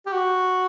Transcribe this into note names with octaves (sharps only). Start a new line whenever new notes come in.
G4
F#4